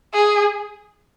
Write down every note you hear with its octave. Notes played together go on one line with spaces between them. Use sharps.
G#4